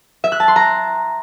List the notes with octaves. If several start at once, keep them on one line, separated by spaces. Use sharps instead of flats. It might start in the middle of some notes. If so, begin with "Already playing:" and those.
E5
F#6
A5
C6
A#5